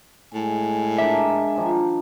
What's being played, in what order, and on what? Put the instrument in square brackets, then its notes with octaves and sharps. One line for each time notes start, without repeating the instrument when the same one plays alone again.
[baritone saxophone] A2 [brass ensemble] G#3 G#5
[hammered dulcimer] D4 A#4 D5 [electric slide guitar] E5
[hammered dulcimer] D#3 F3 D4